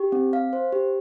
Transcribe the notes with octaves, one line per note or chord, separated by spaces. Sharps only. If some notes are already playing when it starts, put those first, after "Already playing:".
Already playing: G4
C4
F5
C5
G4